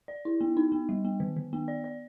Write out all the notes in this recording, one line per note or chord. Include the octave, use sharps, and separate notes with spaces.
D5
E4
B3
D#4
B3
G3
B3
D#3
D#3
B3
D5
D5